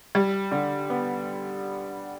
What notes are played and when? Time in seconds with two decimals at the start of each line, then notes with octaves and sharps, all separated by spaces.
0.15 G3
0.52 D3
0.90 B3